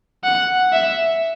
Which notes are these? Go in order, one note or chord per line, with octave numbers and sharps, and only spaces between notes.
F#5
E5